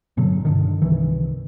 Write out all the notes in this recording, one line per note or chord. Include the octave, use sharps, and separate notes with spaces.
G1 B2 D3 F#3
G2 D3 D#3
C2 D#3 E3